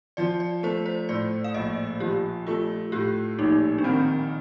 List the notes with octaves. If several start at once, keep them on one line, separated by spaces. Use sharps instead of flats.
F3 D5
D5
A3 C5
C5
A2 D5
F5
A#1 D#5
F3 G4
A3 F4
A2 G4
A#1 D#4
D4
D#3 C4